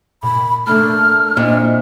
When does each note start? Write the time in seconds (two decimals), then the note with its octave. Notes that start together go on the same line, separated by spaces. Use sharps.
0.23 A#2 B5
0.67 A3 A#3 D4 A4 F6
1.37 A#2 C4 D4 E4 D#5